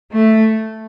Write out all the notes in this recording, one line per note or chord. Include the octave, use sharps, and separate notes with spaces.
A3